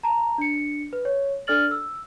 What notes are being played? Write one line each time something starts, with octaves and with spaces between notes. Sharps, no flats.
A5 A#5
D4 C#7
B4
C#5
D4 A4 D5 F6 A6 F#7
E6